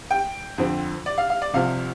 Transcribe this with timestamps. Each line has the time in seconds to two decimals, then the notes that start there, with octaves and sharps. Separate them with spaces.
0.11 G5
0.58 F2 D3 F3 C4
1.06 D5
1.18 F5
1.30 F5
1.42 D5
1.54 C2 C3 F3 F5